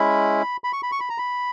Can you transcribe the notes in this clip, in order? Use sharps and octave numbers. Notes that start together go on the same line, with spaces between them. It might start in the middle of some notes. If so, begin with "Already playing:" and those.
Already playing: G#3 C#4 E4 B5
B5
C#6
B5
C#6
B5
A#5
B5